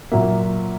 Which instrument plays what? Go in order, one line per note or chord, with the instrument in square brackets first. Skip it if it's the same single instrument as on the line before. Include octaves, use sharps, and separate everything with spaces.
[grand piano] A#2 F#3 A#3 E5